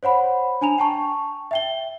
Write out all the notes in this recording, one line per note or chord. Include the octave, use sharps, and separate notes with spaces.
C5 C#5 F#5 B5
D4 G#5 A#5 F7
G5 A5 C#6
E5 G5 G7